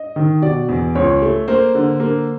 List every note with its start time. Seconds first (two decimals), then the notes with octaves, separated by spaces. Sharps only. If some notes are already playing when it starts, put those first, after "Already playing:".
Already playing: D#5
0.16 D#3
0.42 B2 D5
0.69 E2
0.95 C#2 C#5
1.22 A3
1.48 A#3 C5
1.75 D3
2.00 A#3